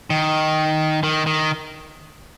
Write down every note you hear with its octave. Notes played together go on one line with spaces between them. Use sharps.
D#3
D#3
D#3